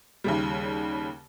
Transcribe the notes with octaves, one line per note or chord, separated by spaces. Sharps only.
D#2 C#3 G3